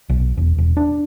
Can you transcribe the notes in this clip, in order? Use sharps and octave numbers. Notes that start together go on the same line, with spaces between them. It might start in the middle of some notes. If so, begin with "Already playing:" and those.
B1
E1
E1
D4